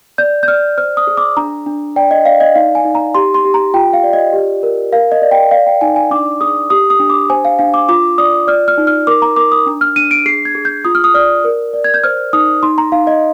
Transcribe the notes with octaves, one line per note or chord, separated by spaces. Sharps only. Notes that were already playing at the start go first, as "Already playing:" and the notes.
D5 G6
G6
D5 F6
C5 F6
D#6
G#4
D6
D4 A#5
D4
D5 G5
D#5
D5 F5
D#5
D#4 F5
G#5
D#4
A#5
G4 C6
C6
G4
A#5
F4 G5
F5
D5
D#5
G4
A#4
A#4 F5
D#5
D5
G5
D5 F5
G5
D#4 G#5
G#5
D4 D6
G#4 D#6
G4 D#6
D#6
D4
D6
C5 G#5
F5
D4 F5
D6
F4 D6
D5 D#6
D5 F6
F6
D#4
F6
A#4 D6
A#5
A#4 D6
D#6
D4
F6
D4 D#7
D7
G#4 C7
G#6
G#4
G6
F4 D#6
F6
D#6
D5 F6
A#4
D5
G#6
G6
C5 F6
D#4 D#6
D#4 C6
A#5
D#4 F5
D#5